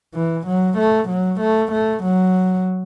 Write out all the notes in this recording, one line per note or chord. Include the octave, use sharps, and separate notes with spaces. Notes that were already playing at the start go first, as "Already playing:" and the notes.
E3
F#3
A3
F#3
A3
A3
F#3